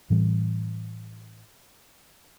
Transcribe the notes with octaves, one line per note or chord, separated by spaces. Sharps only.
A2 E3 G3 C4